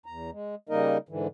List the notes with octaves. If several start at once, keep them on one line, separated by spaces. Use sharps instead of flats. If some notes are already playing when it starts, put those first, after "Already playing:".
E2 A#5
G#3
C#3 G3 A#3 D#4 A#4 D#5
G#2 D3 E3